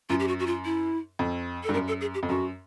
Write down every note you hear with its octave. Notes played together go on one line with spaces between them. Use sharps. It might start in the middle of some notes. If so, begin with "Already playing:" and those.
F#2 F4
G4
F#4
F#4
F4
E4
F2
A4
G2
F#2 A#4
A4
G#4
G4
F2
F#2 F#4